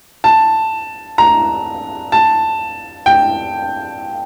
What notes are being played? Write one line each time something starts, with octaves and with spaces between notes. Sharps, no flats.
A5
A#5
A5
G5